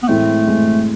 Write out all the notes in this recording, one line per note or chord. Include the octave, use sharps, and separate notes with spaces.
B3
A2 E3 G#3 A3 C4 E4
A2 E3 G#3 C4 E4